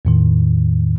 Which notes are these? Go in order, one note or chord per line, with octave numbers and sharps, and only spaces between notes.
E2 A2 D#3